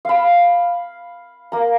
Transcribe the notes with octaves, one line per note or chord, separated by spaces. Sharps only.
F5 B5
A#3 A#5